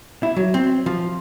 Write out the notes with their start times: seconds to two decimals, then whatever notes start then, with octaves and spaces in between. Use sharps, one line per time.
0.23 E4
0.37 F#3
0.54 C4
0.86 F3